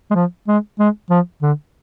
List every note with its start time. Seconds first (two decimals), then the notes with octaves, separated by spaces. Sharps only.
0.11 G#3
0.15 F3
0.48 G#3
0.79 G#3
1.10 F3
1.42 D3